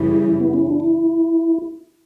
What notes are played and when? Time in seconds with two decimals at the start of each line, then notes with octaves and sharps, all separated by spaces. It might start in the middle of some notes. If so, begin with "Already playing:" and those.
Already playing: F#2 C#3 E3 G3 E4
0.40 B3
0.54 C#4
0.67 D4
0.80 E4